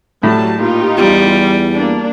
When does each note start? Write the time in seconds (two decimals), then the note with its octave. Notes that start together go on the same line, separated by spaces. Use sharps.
0.23 A2 F#3 G3 A5
0.59 A#2 D#4 F4 G4
0.97 E2 G3
1.74 A#3 D4